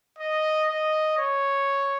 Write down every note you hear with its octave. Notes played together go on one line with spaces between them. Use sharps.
D#5
D#5
C#5